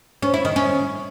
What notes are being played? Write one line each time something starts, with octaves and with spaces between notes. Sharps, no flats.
C#4
E4
D#3
C#4